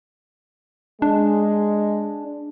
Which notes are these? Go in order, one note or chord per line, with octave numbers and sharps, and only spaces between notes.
G#3 D4